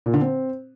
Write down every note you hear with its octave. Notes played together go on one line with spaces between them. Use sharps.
A#2
D3
C4